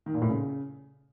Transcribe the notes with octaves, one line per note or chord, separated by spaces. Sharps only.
D#3
A#2
A2
C#3